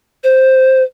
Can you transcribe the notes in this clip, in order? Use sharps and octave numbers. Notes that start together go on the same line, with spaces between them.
C5